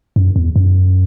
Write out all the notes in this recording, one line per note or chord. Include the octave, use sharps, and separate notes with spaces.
F#2
E2
F#2